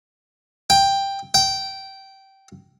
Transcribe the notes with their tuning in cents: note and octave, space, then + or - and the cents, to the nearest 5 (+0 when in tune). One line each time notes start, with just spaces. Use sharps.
G5 +10
G5 -15